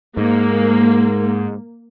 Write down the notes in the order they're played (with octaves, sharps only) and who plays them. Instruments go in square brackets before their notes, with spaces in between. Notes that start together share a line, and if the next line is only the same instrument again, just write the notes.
[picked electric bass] G#2 [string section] A#3